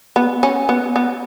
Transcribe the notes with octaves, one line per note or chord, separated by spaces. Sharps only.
B3
C#4
B3
B3